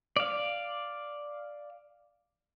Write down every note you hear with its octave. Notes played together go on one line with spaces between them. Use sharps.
D5 F5